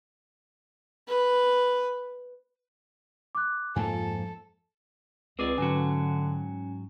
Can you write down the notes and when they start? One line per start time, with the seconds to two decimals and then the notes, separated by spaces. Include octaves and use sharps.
1.08 B4
3.35 D6 F#6
3.76 F2 G#2 F3 A#3 A4 G#5
5.39 C#2 C4 G#4 B4 D5 D6
5.58 G#2 D3 F#3 C#4 F#4 G#5